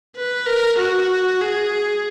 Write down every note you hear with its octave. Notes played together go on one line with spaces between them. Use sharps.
B4
A#4
F#4
G#4